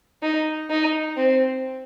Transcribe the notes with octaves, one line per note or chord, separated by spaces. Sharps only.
D#4
D#4
C4